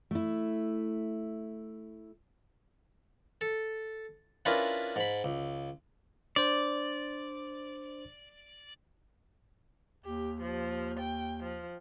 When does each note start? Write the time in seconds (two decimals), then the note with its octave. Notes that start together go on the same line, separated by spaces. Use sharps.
0.11 A3 E4
3.41 A4
4.45 C#4 D4 E4 F4 A#4 B4
4.96 G#2 B5
5.24 C#2
6.36 D4 C5 D5
10.05 D#2 G4
10.42 F3
11.00 G5
11.44 F3